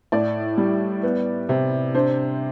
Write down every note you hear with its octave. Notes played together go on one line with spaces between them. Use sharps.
A2 D5
G3
B3
C3
D4 C5